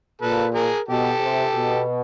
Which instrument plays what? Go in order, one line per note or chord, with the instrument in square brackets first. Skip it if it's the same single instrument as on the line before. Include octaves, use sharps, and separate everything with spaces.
[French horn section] A#2 [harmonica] A4 B4
[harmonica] G#4 A#4
[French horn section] B2 [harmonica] G4 A4
[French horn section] C3
B2